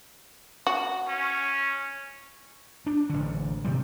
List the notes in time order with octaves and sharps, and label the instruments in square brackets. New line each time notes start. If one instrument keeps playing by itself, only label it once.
[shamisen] F#4
[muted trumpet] C#4
[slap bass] D4
A1 D3
C3 D#3 G3